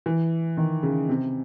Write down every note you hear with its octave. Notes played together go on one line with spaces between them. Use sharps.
E3
D#3
C#3
C3